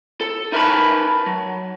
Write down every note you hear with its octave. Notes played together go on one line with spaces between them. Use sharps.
A4
D#4 E4 A#4 B4 A5 B5
F#3